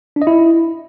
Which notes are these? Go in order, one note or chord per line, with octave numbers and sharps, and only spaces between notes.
D4
D#5
E4